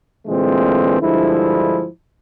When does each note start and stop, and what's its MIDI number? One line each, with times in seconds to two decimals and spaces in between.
0.27 0.98 46
0.27 0.98 50
0.27 0.98 52
0.27 0.98 56
0.27 0.98 57
0.27 0.98 60
1.01 1.85 43
1.01 1.85 50
1.01 1.85 53
1.01 1.85 56
1.01 1.85 64